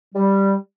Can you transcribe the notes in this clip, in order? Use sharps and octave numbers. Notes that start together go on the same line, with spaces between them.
G3